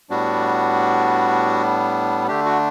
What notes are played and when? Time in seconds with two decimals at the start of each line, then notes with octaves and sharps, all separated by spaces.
0.10 A2 G3 B3 D4 F#4
2.27 D3 A3 D4 G4
2.46 F#4